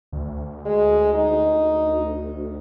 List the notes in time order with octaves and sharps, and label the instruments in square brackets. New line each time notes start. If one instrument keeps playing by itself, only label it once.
[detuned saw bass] D2
[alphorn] G#3
D#4